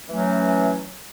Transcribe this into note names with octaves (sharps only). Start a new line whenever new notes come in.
E3 F#3 A3 C#4